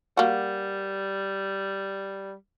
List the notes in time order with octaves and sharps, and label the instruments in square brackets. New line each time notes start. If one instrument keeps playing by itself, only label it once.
[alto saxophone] G3 [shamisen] A#3 F#4